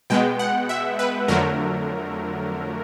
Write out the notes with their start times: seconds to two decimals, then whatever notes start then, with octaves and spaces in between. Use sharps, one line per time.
0.10 B2 G#3 B3 G5
0.39 F#5
0.69 E5
0.99 B4
1.28 F2 D3 F#3 A3 A#4